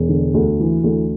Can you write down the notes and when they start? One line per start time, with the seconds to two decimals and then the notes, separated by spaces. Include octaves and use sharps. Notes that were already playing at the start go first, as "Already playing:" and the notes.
Already playing: E1
0.09 D3
0.34 D2
0.60 E3
0.84 D2